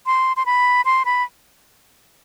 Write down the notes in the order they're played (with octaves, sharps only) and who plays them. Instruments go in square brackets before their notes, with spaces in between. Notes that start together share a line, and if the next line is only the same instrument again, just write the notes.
[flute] C6
C6
B5
C6
B5